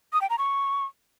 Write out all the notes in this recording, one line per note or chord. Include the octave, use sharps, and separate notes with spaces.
D#6
G5
A#5
C#6